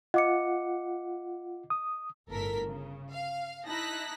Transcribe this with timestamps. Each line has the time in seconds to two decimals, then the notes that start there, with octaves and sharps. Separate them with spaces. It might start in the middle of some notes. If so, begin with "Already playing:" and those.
0.14 F4 D#5 F#5 D6 C#7
1.70 D#6
2.29 G1 A2 A4 A#4 B6
2.68 C#3
3.12 F5
3.67 D#4 E4 A5 F#6 A#6 B6